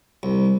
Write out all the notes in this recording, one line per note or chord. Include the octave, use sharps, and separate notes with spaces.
C2